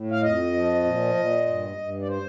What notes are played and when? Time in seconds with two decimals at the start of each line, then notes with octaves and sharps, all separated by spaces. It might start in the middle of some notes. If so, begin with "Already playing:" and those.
Already playing: A2
0.11 F5
0.22 F2 D#5
0.53 F3
0.84 A#2
1.15 A#2
1.46 G2
1.77 G2
2.02 D5
2.08 C5